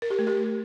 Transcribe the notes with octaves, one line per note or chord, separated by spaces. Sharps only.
A#4
G4
A3
G4